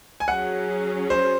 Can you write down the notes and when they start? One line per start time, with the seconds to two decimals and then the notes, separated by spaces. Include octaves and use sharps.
0.20 G#5
0.28 F#3 C#4 G#4 F#5
1.10 C5